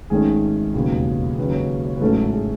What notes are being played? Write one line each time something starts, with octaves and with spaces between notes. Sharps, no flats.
G#1 G#2 D#3 A3 C#4 G#4
E1 D#2 C#3 F#3 B3
D#2 C#3 F#3 C#4 B4
C#5
C#5
B4
A1 G#2 F#3 A3 C#4 A4
F#4
G#4